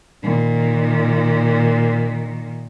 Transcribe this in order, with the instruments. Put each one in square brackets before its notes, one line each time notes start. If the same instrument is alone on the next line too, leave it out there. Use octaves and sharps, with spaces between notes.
[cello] A#2 D#3